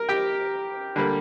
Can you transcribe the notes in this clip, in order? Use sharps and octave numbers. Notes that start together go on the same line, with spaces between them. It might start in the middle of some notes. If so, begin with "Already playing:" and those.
Already playing: A#4
G4 G5
D3 G3 A#3